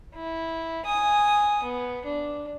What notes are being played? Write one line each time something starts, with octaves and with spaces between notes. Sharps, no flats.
E4
G#5 D#6
B3
D4